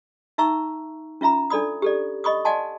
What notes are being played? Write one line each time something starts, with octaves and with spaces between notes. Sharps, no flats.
D#4 E5 A#5 C#6 E6
C#4 F4 E5 A#5 B5
D4 A4 D5 B5 D#6
G4 A4 D5
D#5 B5 C#6 D#6
D5 D#5 F#5 G#5 A5 C6